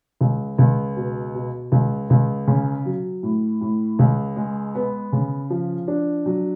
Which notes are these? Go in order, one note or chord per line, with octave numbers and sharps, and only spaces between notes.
C#2
C#2
B2
B2
C#2
C#2
C#3
F#3
A2
A2
C#2
G#3
B3
C#3
F3
D4
F#3